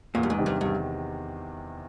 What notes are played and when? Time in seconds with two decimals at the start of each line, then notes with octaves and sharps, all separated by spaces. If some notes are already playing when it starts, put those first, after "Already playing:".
0.15 E2 A#2
0.23 G2
0.30 G#2
0.38 C3 D#3
0.46 G2
0.61 E2 G2